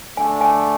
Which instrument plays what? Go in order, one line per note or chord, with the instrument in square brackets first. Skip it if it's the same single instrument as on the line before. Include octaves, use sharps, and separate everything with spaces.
[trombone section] D3 A3 D4 [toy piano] G#5
[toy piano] G#5